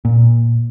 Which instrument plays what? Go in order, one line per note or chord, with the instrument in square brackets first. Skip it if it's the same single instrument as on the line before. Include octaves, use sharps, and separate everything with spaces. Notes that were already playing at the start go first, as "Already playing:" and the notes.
[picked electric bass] A#2